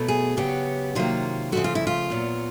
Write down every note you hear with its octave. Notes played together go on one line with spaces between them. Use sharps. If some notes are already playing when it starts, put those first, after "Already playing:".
Already playing: B2 F#3 A3
G#4
C#3 F#3 B3 G4
C3 D#3 F#3 A#3 F4
C#3 F3 A3 F#4
F4
E4
F4
A#2 F#3 B3